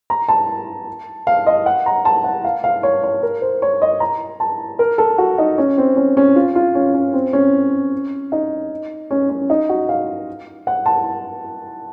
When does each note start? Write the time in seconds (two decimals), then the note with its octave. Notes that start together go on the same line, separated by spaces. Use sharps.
0.10 A#5
0.29 A5
1.27 F5
1.47 D#5
1.66 F#5
1.86 A#5
2.05 A5
2.24 F#5
2.45 F5
2.64 F5
2.83 C#5
3.04 C#5
3.23 A#4
3.42 C5
3.62 C#5
3.82 D#5
4.00 A#5
4.40 A5
4.79 A#4
4.98 A4
5.18 F#4
5.38 D#4
5.58 C#4
5.78 C4
5.97 C#4
6.17 C#4
6.36 F4
6.55 F4
6.75 C#4
6.94 C#4
7.14 C4
7.33 C#4
8.32 D#4
9.11 C#4
9.30 C#4
9.50 D#4
9.69 F#4
9.89 F5
10.67 F#5
10.86 A5